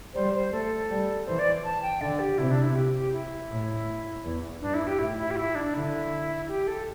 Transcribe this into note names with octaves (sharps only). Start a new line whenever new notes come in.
G3 C5
C5
A3 A4
G3
E3 C5
D5
A5
G5
D3 D5
G4
C3 E4
D4
E4
G4
G4
E4
A2
E2
G2 D4
E4
G4
A2 E4
E4
G4
E4
D4
D3 E4
G4
A4